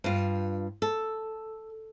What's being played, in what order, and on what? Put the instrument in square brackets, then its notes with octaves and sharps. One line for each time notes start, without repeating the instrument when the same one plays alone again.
[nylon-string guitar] G2 F4
A4